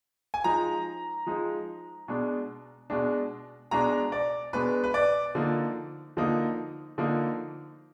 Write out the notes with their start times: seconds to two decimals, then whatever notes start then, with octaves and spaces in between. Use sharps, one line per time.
0.34 G#5
0.44 F3 G#3 D#4 A#5
1.26 F3 G#3 D#4
2.08 B2 G#3 D4
2.90 B2 G#3 D4
3.71 B2 G#3 D4 A#5
4.12 D5
4.53 B2 G#3 D4 B4
4.84 B4
4.94 D5
5.35 D3 F3 A#3 D#4
6.17 D3 F3 A#3 D#4
6.98 D3 F3 A#3 D#4